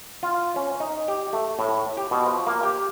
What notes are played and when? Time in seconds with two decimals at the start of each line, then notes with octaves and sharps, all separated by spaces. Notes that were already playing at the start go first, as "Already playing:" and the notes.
0.23 F4
0.56 C#4
0.80 D#4
1.08 G4
1.33 A3
1.59 A2
1.97 G4
2.11 B2
2.26 F3
2.47 A#3
2.63 G4